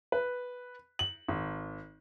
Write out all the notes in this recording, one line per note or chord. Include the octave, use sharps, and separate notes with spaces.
B4
F#7
G#1